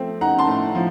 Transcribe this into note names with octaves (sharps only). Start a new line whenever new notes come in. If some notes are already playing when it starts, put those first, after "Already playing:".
Already playing: F3 A3 C4
D#4 F#5 A#5
A5 C6
A2
F3